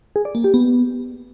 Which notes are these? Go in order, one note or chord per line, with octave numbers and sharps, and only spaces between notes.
G#4
D5
A#3
G4
B3